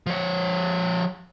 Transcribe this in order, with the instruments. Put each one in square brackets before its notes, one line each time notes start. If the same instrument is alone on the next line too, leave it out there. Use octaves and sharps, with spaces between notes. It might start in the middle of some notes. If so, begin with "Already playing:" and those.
[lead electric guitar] F3 C#5